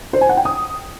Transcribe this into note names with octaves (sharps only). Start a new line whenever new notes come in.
C5
G#5
F#5
G5
D#6